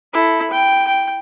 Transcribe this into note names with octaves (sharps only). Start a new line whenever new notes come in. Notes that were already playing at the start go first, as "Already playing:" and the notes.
E4 A4
G5
G5